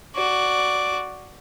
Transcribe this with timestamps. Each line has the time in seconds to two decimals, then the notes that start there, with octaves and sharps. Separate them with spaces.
0.16 F#4 D5